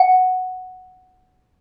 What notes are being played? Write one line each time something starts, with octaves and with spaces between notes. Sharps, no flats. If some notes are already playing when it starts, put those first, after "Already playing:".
Already playing: F#5